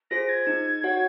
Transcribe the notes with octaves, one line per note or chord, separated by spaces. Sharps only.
F4 G#4 C5 A#6
G#6
D#4
F#4 C#5 F#5